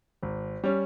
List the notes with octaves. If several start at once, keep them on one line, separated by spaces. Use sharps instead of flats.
G#1
G3 C#4